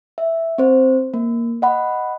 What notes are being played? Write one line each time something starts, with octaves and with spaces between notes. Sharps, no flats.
E5
C4 C5
A#3
D#5 F#5 B5